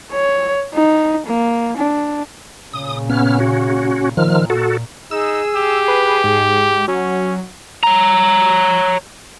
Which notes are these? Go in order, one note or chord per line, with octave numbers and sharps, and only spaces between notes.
C#5
D#4
A#3
D4
A#2 C#3 D#6
B3 C#4 F6
C#4 F#4
A#2 D#3 F3 F6
F#4 A4
D#4 G#4 E6
G4
B4
G#2
F#3 C#4
C#5 A#5